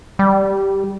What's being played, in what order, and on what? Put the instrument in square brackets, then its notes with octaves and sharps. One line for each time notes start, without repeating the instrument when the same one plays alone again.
[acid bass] G3